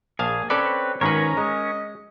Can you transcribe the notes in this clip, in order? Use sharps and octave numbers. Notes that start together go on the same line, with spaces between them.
A#1 G#4 F5 A5
C4 C#4 A4 B4 C#5 D5
G#1 D#3 C#4 A#4 B4 C#5 A#5
G#3 D#5